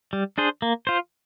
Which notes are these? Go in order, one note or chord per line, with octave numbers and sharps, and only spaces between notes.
G3
D4 G#4 C5
A#3
F4 C5